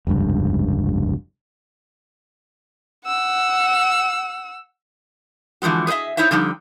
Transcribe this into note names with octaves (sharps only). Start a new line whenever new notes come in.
F1 C#2 G2
F#5 E6
D3 E3 F3 G#3 F#4
G#4 B4 C5 D#5 E5
D#4 E4 C5 C#5 E5
D3 F3 G3 D#4